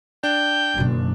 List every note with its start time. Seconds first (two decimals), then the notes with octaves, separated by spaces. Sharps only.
0.23 D4 G5
0.78 F#1 B2 D#3